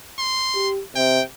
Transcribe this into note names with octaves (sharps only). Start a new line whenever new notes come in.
C6
G4
C3 G5